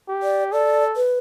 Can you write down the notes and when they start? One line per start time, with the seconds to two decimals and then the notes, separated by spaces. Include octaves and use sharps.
0.08 G4
0.23 D5
0.52 A4 D5
0.96 B4